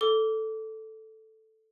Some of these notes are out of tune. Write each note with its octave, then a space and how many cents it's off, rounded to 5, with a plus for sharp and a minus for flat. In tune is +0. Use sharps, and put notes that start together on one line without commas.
A4 +0 D6 -20